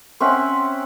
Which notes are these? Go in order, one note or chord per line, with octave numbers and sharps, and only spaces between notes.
C4 C#4 E5 F#5